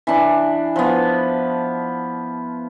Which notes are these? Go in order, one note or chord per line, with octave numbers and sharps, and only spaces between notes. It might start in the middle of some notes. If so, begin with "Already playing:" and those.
E3 D4
F3 B3